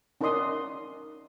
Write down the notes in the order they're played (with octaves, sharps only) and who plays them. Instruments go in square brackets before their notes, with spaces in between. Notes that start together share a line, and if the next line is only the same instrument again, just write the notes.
[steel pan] C#4 D#4 A#4 D5 C6 D#6